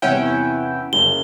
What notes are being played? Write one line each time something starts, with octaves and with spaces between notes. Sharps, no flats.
E2 C3 C#4 E4 F#5 G5
F#1 C#3 C#4 G7